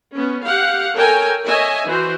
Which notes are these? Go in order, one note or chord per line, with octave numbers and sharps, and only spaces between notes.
B3 C#4
G4 F5 F#5
A4 A#4 C#5 G5 G#5
C#5 D#5 E5 G#5
E3 F#4 C5